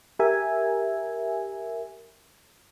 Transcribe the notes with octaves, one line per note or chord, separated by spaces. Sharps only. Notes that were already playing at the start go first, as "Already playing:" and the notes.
G4 A#4 E5 G#5